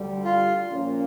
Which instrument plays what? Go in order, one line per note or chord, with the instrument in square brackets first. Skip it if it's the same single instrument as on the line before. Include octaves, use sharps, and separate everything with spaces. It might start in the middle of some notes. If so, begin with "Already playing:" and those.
Already playing: [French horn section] D2 D3 G3
[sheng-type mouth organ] F4
[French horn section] A#2 F3 A#3 C#4